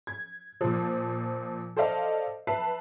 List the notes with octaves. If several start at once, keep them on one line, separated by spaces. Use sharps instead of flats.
G#6
A#2 F3
A4 C5 D5 D#5 F5 A5
B4 E5 A5 C7